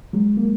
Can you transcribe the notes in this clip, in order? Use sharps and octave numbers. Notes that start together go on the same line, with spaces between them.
F#3 G#3
A#3